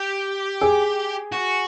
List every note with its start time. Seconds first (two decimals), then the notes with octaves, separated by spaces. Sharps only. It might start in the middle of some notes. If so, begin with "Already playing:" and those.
Already playing: G4
0.61 G#4
1.32 F#4